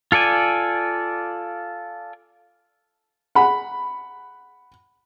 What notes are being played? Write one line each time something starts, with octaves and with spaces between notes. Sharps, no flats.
F4 A4 D5 G#5
F#5 B5